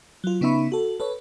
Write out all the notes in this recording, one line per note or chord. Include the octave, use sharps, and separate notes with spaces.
F#3 F4
C#3 B3 D#4 E5 B5 C#6
F#4 A4
A4 B4 C#5